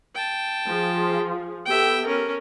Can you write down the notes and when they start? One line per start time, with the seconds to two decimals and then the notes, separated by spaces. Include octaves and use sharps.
0.14 G5 A5
0.66 F3 F4 G#4
1.66 B3 G4 A4 E5 G5
2.05 C#4 A#4